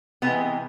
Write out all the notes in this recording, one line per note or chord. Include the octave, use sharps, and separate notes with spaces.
C3 E3 G#3 B3